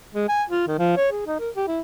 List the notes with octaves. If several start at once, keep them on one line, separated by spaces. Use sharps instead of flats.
G#3
G#5
F4
D#3
F3
C#5
G#4
D#4
A#4
G4
E4